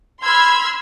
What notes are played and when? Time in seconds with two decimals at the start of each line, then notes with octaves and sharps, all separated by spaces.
0.23 B5 C6 E6 F6 G#6